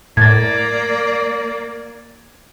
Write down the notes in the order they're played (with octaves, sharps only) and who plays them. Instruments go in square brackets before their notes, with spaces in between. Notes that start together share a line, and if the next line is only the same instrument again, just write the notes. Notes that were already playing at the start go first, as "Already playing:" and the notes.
[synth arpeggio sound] A2 [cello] A#3 D5 [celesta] G#6 A6